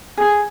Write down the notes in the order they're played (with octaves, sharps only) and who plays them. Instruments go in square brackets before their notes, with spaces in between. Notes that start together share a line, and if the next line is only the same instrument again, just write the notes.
[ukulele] G#4